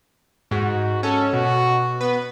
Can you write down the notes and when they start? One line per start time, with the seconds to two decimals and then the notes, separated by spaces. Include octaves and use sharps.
0.51 G#2 F#4
1.03 C#4 A4
1.33 B2 F#4
2.01 B3 B4